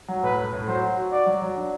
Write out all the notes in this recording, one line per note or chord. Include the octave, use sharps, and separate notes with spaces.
F#3
A2 B4
A2
A2
F#3 C5
F#4
F#4
F#4 D5
F#3
F#3
D4